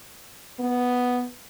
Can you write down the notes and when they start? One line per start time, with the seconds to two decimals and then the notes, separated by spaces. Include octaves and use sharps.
0.60 B3